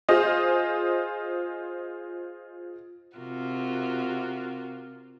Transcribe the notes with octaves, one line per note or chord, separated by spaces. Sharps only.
F4 G#4 C5 D#5
C3 F4 F#4 A#4